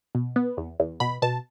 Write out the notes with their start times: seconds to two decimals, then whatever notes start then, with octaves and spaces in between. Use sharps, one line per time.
0.15 B2
0.36 B3
0.57 E2
0.80 E2
1.00 B2 B5
1.22 B2 A5